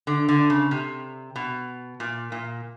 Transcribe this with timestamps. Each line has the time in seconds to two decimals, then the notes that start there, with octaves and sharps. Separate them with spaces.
0.07 D3
0.29 D3
0.50 C#3
0.71 C3
1.36 B2
2.00 A#2
2.32 A#2